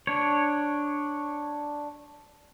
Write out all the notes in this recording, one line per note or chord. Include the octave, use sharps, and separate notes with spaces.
D4 C#5